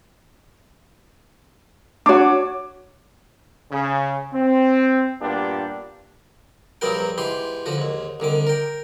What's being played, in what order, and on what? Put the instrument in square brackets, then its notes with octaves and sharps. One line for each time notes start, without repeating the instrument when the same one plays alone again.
[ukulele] D4 F#4 [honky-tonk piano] C#5 D6
[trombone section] C#3
C4
G2 A#2 B3 D4 F4 G4
[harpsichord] A#1 G2 F#3 B3 A#4 G5
G#2 E3 G4 C6
D3 F3 F#4
D#2 G#2
C2 D3 D#3 D6
A#4 G5